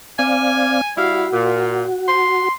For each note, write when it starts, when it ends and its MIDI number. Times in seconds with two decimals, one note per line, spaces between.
0.19 0.81 60
0.19 0.81 74
0.19 0.81 77
0.19 0.89 80
0.98 1.25 55
0.98 1.25 64
0.98 2.49 66
0.98 1.25 77
1.33 1.84 46
2.08 2.52 84